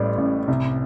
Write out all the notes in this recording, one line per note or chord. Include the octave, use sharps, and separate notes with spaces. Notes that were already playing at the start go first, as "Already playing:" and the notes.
Already playing: A1 A2 G3
A1
C2